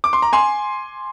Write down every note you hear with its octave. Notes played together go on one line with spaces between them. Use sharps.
D6
C6
A#5
G#5 C6